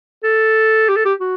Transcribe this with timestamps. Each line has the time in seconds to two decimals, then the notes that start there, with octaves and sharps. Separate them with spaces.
0.23 A4
0.89 G4
0.96 A4
1.05 G4
1.20 F#4